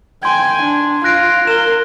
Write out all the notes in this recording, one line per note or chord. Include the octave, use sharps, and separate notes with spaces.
G5 G#5 C6 G#6
D4
F4 F#6 A#6 D7
A#4 E7 G7